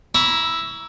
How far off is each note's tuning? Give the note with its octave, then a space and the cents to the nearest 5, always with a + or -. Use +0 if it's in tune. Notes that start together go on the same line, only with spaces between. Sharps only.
E4 +0 A#5 +25 C#6 +25